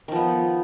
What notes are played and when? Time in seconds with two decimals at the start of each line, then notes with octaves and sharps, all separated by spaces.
0.08 D#3
0.12 F3
0.15 B3